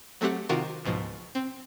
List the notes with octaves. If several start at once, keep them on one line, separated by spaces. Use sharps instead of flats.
F#3 A3 C4 G4 F#5
C3 D#3 F4 F#4 A#4
C#2 G#2 B2 F3
C4